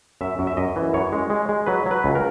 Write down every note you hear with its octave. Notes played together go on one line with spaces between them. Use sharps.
F#2 E5
F#2
E5
F#2 D#5
E3
F#2 C#5
G#3
G#3
G#3
F#3 B4
F#3
B4
C#2
A#4